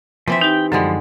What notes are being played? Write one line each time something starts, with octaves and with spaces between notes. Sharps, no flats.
E3 F3 C4 E5
D#4 G4 G5
F#2 D3 E3 F3 G3 G#3